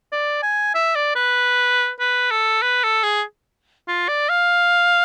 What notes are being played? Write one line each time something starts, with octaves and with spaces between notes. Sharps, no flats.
D5
G#5
E5
D5
B4
B4
A4
B4
A4
G#4
F4
D5
F5